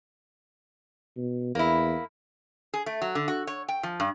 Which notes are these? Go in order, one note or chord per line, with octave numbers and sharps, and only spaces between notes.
B2
E2 A#3 E4
G#4
A3
F#3
D3
F#4
C#5
G5
F3
G2